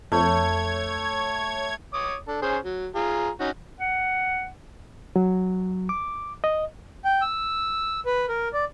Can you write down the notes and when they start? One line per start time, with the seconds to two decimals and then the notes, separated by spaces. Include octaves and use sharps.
0.12 F2 A3 C#5 G#6
1.94 C#5 D6 D#6
2.28 D4 A4
2.42 C#4 G#4 C5
2.65 F#3
2.95 F4 G#4 A#5
3.40 C#4 D#4 F#4
3.80 F#5
5.16 F#3
5.89 D6
6.44 D#5
7.05 G5
7.22 E6
8.06 B4
8.29 A#4
8.53 D5